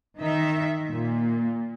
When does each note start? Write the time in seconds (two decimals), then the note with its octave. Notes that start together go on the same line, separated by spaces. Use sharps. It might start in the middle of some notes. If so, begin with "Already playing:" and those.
0.19 D#3 D#4 E5
0.91 A#2